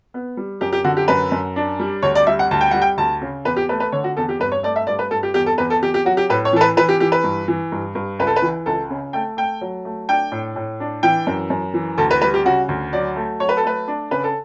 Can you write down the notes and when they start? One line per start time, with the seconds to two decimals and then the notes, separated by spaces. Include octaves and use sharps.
0.14 B3
0.37 G3
0.61 F#2 G4
0.73 G4
0.84 D3 F#4
0.97 G4
1.08 F#2 B4
1.32 F#2
1.56 D4
1.80 G3
2.03 D2 C#5
2.15 D5
2.27 G3 E5
2.39 F#5
2.51 D2 A5
2.61 G5
2.71 G3 F#5
2.82 G5
2.97 D2 A5
3.22 C#3
3.45 E2 B4
3.57 G4
3.69 A3 B4
3.80 B4
3.92 D3 C#5
4.04 F#4
4.17 E2 A4
4.29 G4
4.39 G2 B4
4.52 C#5
4.63 A3 D5
4.76 E5
4.87 G2 D5
4.99 B4
5.11 G2 A4
5.23 G4
5.34 E2 G4
5.46 A4
5.58 E2 B4
5.70 A4
5.82 E2 G4
5.94 G4
6.05 F#3 F#4
6.17 G4
6.30 A2 B4
6.45 C#5
6.53 E3 A4
6.61 B4
6.77 E3 B4
6.89 G4
7.00 E3 G4
7.12 B4
7.24 G2
7.48 E3
7.72 G2
7.95 G2
8.19 C#2 B4
8.27 A4
8.36 B4
8.42 E3
8.66 C#2 A4
8.90 C#3
9.13 A3 G5
9.37 A3 G5
9.61 F#3
9.85 A3
10.09 D4 G5
10.32 A2
10.56 A2
10.80 D4
11.03 E3 G5
11.27 F#2
11.50 F#2
11.74 E3
11.98 D2 A4
12.11 B4
12.21 G3 B4
12.34 G4
12.45 C#3 F#4
12.69 D2
12.93 F#3 D5
13.16 A3
13.40 F#3 C#5
13.49 B4
13.57 A4
13.64 A3 B4
13.88 D4
14.11 C#3 B4
14.24 A4